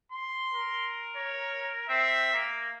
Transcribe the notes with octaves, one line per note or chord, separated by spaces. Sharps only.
C6
A#4
C#5
C4 E5
A#3